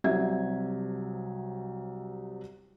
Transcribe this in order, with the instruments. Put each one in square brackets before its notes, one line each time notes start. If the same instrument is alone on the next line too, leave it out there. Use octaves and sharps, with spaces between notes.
[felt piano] C2 C3 F#3 E5 G#6